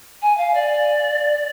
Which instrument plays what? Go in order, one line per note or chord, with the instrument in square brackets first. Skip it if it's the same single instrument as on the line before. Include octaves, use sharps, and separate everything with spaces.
[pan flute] G#5
F5
D5